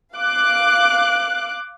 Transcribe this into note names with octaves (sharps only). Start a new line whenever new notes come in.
F5 D6 F#6